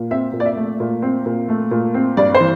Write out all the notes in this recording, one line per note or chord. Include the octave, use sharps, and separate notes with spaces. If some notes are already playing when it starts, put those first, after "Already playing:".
Already playing: A#2
C4 E5
A#2
D5
E5
A3
A#2
C4
A#2
A3
A#2
C4
G2 D5
C5
E3